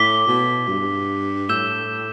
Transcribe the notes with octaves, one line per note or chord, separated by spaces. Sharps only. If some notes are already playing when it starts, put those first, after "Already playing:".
Already playing: A2 D6 B6 G7
B2
G2
A2 E6 G6 E7 G7